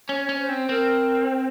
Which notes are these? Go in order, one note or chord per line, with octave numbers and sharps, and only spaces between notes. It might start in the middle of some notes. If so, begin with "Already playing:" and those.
C#4 C#5
C#4
C5
C4
C4 A#4
C5